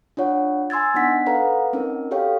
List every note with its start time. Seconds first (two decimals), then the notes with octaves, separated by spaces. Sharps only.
0.17 D4 F4 C#5 F#5
0.70 G#5 C6 E6 G#6 A6
0.94 B3 D4 D#4 F#5 B6
1.26 A4 B4 F5 F#5 A#5
1.73 C4 C#4 D#4 A#4
2.11 F#4 G4 A4 C#5 F5 G5